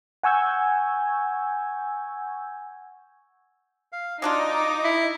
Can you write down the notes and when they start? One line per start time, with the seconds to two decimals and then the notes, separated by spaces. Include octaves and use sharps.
0.23 F#5 G#5 C#6 E6 G6 G#6
3.92 F5
4.22 F#3 D4 D#4 F4 D6 D#6
4.84 E4